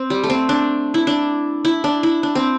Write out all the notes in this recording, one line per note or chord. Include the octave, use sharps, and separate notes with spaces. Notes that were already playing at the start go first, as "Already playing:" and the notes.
Already playing: C4
G3
A3
C4
D4
E4
D4
E4
D4
E4
D4
C4